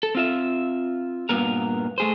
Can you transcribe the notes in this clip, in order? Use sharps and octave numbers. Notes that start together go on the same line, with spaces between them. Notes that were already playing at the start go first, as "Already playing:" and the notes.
A4
C4 F4 E5
G2 A#2 B3 A#4
A3 G#4 C5